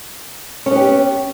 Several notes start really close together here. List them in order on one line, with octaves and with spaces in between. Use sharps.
C#4 B3 G4